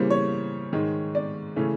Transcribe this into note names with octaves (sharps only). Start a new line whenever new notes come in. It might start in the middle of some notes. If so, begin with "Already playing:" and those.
Already playing: C#3 E3 G3 A#3 C5
C#5
G#2 D#3 G#3
D5
C#3 E3 A3 C#4